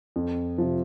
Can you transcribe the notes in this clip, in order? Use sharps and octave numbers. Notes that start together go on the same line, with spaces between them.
F2
C3 F3